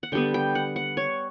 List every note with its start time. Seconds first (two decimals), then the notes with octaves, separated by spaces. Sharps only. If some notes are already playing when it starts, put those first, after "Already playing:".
0.03 F#5
0.12 D3 G3 B3 G5
0.34 G5
0.55 F#5
0.76 F#5
0.97 C#5